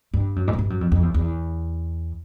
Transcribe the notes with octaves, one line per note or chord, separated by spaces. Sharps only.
G2
F#2
G#2
F#2
G2
F#2
F2
F2
E2
E2